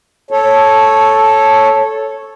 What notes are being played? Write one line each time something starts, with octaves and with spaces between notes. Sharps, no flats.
A4 C#5